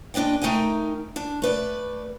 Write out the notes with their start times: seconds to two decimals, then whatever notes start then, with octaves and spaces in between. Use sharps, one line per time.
0.14 A#2 D4 B4 D#5 G5
0.42 A3 D#4 A#4 G5 G#5
1.16 D4
1.42 A3 B4 D5